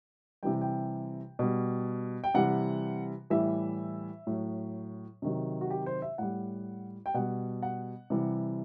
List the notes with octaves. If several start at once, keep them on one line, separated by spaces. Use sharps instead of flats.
C3 E3 G3 G5
G5
B2 G3
G5
C3 E3 G3 F#5
A2 E3 G3 E5
A2 F#3
C3 D#3 F#3
F#4
G4
C5
E5
A2 G3 F#5
G5
B2 G3 F#5
F#5
C3 E3 G3